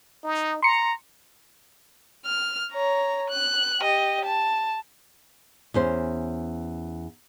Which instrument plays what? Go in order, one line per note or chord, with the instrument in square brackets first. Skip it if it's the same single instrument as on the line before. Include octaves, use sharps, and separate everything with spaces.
[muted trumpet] D#4
[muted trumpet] A#5 [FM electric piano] C6 C#7
[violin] F6
C#5 A#5
F#6
G4 D#5
A5
[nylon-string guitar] E2 C#4 C5